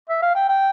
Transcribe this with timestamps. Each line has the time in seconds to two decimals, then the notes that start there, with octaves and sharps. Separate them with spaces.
0.09 E5
0.22 F5
0.35 G5
0.49 G5